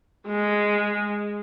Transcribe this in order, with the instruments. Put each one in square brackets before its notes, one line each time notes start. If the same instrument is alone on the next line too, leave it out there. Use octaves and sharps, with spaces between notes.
[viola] G#3